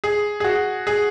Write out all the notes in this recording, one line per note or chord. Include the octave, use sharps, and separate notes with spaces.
G#4
G#4
F#4
G#4